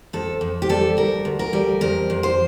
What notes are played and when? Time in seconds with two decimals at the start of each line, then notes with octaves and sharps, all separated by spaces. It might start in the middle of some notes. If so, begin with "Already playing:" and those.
0.13 F2 A4
0.41 F2
0.62 G4
0.69 G3 A4
0.97 D2 A#4
1.25 D2
1.39 A#4
1.53 G3
1.81 F2 A#4
2.10 F2
2.23 C5